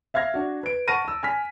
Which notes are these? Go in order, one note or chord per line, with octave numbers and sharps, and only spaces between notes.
E5 F5 F6 G#6 A#6
D4 F#4
B4 D7
F#5 A5 C#6 F6 A#6 D#7
A5 E6
G#5 F6 B6